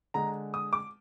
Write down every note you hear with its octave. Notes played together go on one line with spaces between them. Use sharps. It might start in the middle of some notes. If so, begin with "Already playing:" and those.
D3 G#3 A#5
D#6
D6